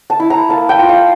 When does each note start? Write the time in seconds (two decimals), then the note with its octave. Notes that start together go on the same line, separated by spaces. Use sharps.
0.10 A5
0.20 E4
0.30 A#5
0.49 A#3 A5
0.69 G5
0.79 F4
0.89 F5